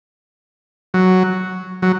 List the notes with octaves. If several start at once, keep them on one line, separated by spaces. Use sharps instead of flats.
F#3
F#3